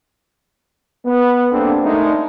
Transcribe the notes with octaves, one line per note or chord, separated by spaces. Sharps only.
B3
G2 A#3 C4 D4 A4
G#3 A3 D4 D#4 A#4